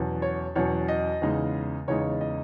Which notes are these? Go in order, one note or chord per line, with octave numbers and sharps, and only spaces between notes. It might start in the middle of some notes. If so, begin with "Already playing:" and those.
Already playing: E2 B2 F#3 C#4
C#5
E2 B2 F#3 C#4 C#5
D#5
E2 C#3 G#3 D#4
E2 C#3 G#3 D#4 C#5
D#5